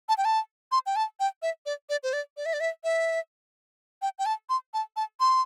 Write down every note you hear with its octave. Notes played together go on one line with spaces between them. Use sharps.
A5
G5
A5
C6
G5
A5
G5
E5
D5
D5
C5
D5
D5
E5
D5
E5
E5
G5
G5
A5
C6
A5
A5
C6